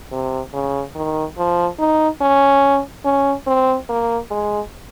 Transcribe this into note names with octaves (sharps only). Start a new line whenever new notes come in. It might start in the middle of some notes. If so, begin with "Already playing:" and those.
C3
C#3
D#3
F3
D#4
C#4
C#4
C4
A#3
G#3